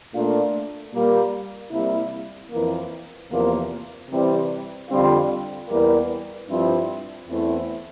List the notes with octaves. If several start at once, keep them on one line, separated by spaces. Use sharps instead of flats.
A#2 A3 D4 F4
A#2 G3 A#3
C3 G3 A#3 E4
F2 E3 A#3
E2 C3 F3 A#3
C3 E3 G3 C4 G4
F2 D3 G3 C4 F4
E2 E3 G3 A#3
G2 F3 C4 E4
E2 E3 A3 C4 E4